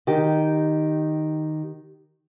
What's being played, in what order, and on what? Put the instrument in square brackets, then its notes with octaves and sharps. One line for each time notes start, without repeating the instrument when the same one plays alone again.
[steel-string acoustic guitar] D#3 G4